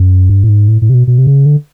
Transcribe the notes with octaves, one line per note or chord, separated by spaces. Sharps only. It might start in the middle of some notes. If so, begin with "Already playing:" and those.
Already playing: F#2
G2
A2
G#2
A2
A2
C3
B2
B2
C3
C#3
D3